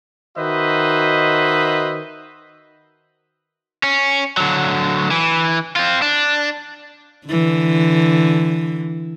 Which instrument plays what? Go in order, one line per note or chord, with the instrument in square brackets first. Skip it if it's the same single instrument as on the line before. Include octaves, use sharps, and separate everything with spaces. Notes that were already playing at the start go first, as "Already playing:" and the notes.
[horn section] D#3 F#4 B4 C5 D#5 E5
[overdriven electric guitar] C#4
D3 F#3
E3
C4 F4
D4
[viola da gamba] D3 E3